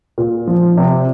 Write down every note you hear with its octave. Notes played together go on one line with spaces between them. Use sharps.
A#2
F3
C3